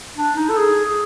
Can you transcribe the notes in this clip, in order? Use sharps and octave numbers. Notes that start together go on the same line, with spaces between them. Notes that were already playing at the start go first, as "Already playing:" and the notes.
D4
D#4
A4
G#4